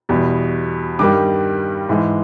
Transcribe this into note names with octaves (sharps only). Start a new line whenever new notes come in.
E2 B2 G3
G2 D#3 G3 D6
G#2 E3 G#3